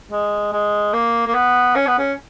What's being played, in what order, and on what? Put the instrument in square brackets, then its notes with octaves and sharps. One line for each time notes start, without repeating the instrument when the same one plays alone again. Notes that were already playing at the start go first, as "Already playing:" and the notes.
[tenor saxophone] G#3
G#3
A#3
A#3
B3
C#4
B3
C#4